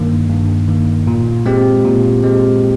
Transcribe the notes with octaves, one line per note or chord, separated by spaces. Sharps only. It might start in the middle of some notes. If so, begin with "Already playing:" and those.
Already playing: G2 D#3 A#3
G2
D#3 A#3
A#2
G#3 C4 G4
A#2
G#3 C4 G4